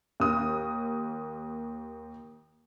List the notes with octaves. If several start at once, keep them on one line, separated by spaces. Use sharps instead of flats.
D#2 D#6